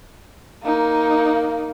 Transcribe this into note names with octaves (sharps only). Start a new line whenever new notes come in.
A#3 D#4